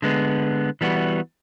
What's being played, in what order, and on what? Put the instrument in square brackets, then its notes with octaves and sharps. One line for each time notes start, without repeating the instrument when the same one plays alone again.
[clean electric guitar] D3 G#3 B3
E3 G3 B3 F#4